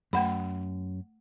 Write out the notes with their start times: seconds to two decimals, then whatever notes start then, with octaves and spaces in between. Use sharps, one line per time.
0.13 F#2 A3 F#5 B5